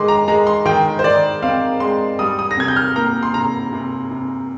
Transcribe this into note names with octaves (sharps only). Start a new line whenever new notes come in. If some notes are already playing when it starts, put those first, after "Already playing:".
Already playing: D#3 G#3 C6 D6
A#5
G#3 A#5
C6
D#3 G5
C5
D#3 D5
C4 F5
G#3 C6
G3 D#6
D#6
A#6
C3 G#6
G6
F6
A#3 A#5
C6
C3 A#5
C3
C3